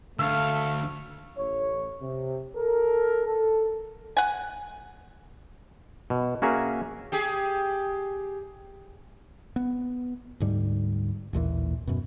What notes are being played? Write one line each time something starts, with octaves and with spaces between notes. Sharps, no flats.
D2 A3 F5 E6
A1 C#5
C3
A4 A#4
A4
F#5 G#5
B2
A#3 C#4 F#4 G#4 E5 A#5
G4 G#4
B3
D2 G#2 G3
A1 D#2 A#2 E3
F#2 B2